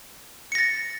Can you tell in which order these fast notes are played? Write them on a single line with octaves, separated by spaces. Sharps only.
C#7 A#6 A6